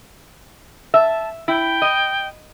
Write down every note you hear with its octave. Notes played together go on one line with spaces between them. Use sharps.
E5 A5
E4 G5
D#5